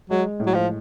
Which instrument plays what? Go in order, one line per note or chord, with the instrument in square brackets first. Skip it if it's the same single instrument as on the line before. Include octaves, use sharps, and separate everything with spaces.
[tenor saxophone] F#3 [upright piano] G#3
[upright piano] A2
[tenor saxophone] F#3
F3